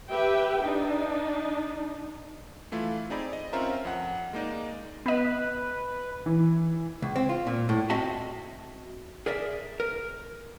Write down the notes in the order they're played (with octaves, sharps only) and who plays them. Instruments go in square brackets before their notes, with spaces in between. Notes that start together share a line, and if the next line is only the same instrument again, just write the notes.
[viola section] G4 B4 E5 G5
D4 D#4
[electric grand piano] E3 A3 E4 F4
C4 D#4 G#4 D5 B5
D#5
C4 C#4 F4 A#4 E5 A#5
F2 F#5
G#3 A#3 D#4 D5
[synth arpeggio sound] B3 D#5 [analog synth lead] B4
[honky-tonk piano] E3
[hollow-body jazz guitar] C#2
C4
F4
A#2
A2
C4 F#4 D#5 E5 A5
G#4 A#4 D5 E5
A#4